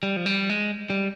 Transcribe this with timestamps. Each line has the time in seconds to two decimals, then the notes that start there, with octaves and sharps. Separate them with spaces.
0.03 G3
0.17 F3
0.26 G3
0.50 G#3
0.90 G3